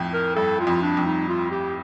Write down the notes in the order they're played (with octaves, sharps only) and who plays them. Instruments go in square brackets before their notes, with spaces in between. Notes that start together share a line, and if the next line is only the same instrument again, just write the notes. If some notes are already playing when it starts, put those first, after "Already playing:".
Already playing: [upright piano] F2 A2
[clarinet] A#4
[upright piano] G2 [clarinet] A4
[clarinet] F4
[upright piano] F2
[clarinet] D4
[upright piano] F2
[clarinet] D#4
F4
G4